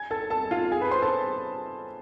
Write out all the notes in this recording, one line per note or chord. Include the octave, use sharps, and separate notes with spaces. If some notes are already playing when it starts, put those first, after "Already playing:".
Already playing: G#5 G#6
A4 A5
A4 A5
F4 F5
G#4 G#5
B4 B5
C5 C6
A4 A5